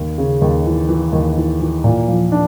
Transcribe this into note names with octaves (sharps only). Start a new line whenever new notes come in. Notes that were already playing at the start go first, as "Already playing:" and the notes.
Already playing: D#2
C#3
D#2
E3
E3
D#2
E3
E3
A#2
F3
D4